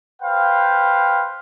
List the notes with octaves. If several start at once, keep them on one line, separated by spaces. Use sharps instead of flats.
B4 C5 F5 G5